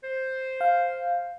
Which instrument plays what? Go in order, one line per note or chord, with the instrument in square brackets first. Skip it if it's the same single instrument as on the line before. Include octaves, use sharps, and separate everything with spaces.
[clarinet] C5
[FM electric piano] F5